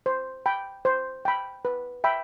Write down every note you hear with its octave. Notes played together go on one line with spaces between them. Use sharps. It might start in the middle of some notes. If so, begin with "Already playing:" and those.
C5
G5 B5
C5
G5 B5
B4
E5 G5 B5